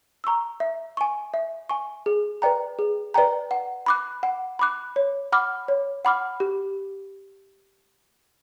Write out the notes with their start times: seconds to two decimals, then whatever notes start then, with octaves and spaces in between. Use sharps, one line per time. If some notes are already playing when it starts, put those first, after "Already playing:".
0.24 A#5 C#6 E6
0.60 E5
0.97 G#5 C#6
1.34 E5
1.69 G#5 C#6
2.06 G#4
2.42 B4 D5 G5 A#5
2.79 G#4
3.14 B4 D5 G5 A#5
3.51 F#5
3.86 B5 D6 F#6
4.23 F#5
4.59 B5 D6 F#6
4.96 C#5
5.32 F#5 B5 D6 F6
5.68 C#5
6.05 F#5 B5 D6 F6
6.40 G4